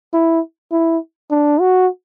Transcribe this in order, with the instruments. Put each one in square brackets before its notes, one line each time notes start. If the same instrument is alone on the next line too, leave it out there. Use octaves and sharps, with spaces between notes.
[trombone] E4
E4
D4
F#4